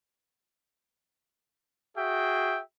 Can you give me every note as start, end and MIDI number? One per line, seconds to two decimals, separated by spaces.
1.98 2.60 66
1.98 2.60 68
1.98 2.60 76
1.98 2.60 79